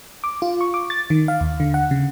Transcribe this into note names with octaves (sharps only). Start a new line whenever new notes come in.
D6
F4
C#6
D6
A6
D#3
F5
D#2
D3
F#5
C#3